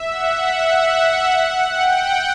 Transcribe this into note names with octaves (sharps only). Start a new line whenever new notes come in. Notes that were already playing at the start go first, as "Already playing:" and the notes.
Already playing: E5
F#5
F#5
F#5
G5